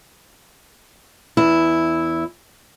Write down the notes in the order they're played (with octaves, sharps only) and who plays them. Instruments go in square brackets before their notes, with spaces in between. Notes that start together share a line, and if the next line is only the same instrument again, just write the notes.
[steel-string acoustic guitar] E2 E4